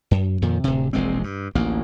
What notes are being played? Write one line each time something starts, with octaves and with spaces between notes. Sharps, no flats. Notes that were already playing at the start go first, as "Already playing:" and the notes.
F#2
F2 A#2 D#3
D1 C3
E1 A#1 G#3 C4
G2
A1 D2 A#3